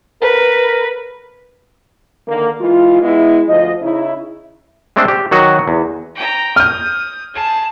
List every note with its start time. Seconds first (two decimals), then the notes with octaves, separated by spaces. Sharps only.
0.22 A#4 B4
2.28 D3 D#3 A#3
2.60 E3 G#3 F4
3.02 G#3 B3 E4
3.49 D2 F3 D#5
3.82 C#3 D#4 E4
4.96 G#3 A3 C4 D4 A4 C5
5.08 G4
5.31 D#3 F#3 F#4 D#5 F#5
5.68 E2
6.15 G5 A#5
6.56 D#6 F6 G6
7.34 G#4 A5